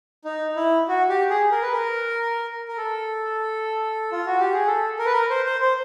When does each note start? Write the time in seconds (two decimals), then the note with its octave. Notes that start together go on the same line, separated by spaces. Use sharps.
0.25 D#4
0.56 E4
0.88 F#4
1.09 G4
1.30 G#4
1.51 A#4
1.62 B4
1.73 A#4
2.68 A#4
2.77 A4
4.12 F4
4.26 F#4
4.40 G4
4.53 G#4
4.67 A4
4.99 A#4
5.06 B4
5.13 A#4
5.30 C5
5.46 C5
5.62 C5